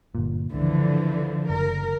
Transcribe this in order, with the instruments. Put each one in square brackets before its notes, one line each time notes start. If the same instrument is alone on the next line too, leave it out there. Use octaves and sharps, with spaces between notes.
[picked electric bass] G1 A#2
[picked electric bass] C#2 [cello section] D3 E3 F3
[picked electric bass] F#1 [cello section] A#4